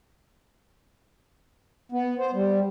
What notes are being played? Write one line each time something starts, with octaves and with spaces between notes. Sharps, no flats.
B3
C5
G3